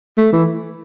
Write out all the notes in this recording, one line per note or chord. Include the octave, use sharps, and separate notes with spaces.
A3
E3